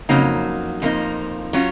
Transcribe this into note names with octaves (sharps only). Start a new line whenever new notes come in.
F2 C#3 F#3 A#3 D#4
F2 F3 A#3 D#4
F#3 C#4 F4